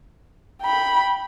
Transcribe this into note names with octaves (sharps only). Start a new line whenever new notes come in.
G5 B5